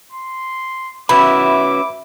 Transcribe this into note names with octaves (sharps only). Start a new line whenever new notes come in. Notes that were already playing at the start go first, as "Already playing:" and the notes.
C6
C#4 E4 F#4 B4 B5 D6